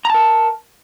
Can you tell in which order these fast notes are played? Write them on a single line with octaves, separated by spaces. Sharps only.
A#5 A5 A#4